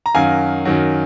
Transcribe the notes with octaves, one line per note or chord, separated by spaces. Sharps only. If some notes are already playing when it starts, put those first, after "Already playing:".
A#5
F#2 D#3 F#3 F5 G#5
F#2 D#3 F#3